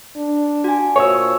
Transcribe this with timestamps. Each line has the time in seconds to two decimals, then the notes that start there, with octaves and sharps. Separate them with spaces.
0.17 D4
0.64 F#4 G#5
0.96 A#2 A4 C5 C#5 E6